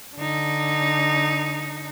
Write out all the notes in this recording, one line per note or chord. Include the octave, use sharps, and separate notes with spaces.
D3 D#4